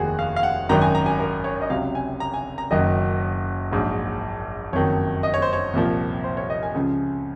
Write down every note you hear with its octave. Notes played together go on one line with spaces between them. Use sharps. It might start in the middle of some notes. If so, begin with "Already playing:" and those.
Already playing: F1 D#2 D#3 F#4 G#4
F5
F5
F#5
G#1 F#2 D#3 F#3 A#5
G#5
A#5
G#5
A#4
C#5
D#5
C#2 C3 F#3 F5
G#5
A#5
G#5
A#5
F#1 F#2 D#3 F#3 D#5
A#1 G#2 F#3
F#1 F2 D#3 F#3 C#5
D#5
C#5
C5
C#5
C2 A#2 F3
C5
C#5
D#5
G#5
C#2 C#3 F3